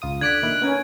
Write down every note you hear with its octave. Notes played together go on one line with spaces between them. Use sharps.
C#2 F4 D#6
D3 D5 F#6 G#6 B6 D7
A#2 D#3 E4
B3 C#4 A#4 G#5